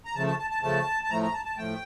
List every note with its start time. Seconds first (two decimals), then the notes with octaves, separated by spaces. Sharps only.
0.05 A#5
0.15 C#3 F3 A3 A5
0.27 A5
0.39 A5
0.50 A5
0.62 C#3 F3 A3 A5
1.03 A5
1.10 A2 F3 A3 A#5
1.22 A#5
1.33 A5
1.45 A5
1.57 A2 F3 A3 G5